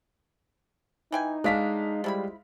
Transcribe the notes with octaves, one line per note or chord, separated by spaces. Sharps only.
E3 D#4 G5 G#5
C#3 G#3 A3 D4 F5 B6
F3 G3 E4 B5